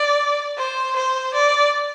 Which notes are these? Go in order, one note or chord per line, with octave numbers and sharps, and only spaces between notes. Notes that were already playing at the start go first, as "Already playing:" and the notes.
Already playing: D5
C5
C5
D5